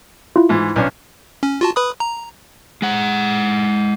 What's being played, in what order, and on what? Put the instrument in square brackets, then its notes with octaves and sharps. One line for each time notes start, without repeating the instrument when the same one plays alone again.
[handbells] E4 F4
[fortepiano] G#2 E3
B1 C#4 D4
[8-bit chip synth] C#4
F4 F#4 A5
B4 B5 D#6
A#5
[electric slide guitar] G#3 F#5